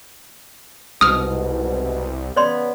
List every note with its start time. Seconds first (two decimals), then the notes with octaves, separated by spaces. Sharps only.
1.01 C2 G#2 B2 D#6 F6
2.36 C#3 B3 C#5 D5 C6